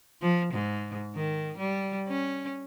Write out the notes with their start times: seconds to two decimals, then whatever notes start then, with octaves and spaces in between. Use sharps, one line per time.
0.21 F3
0.53 G#2
1.15 D#3
1.58 G3
2.08 C#4